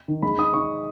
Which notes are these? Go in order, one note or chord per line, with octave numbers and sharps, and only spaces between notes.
D#3
G#3 B5
D#4 D#6
D#4 C#6